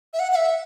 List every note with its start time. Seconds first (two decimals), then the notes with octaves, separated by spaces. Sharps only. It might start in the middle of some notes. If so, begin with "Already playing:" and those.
0.13 E5
0.19 F#5
0.32 F#5
0.36 E5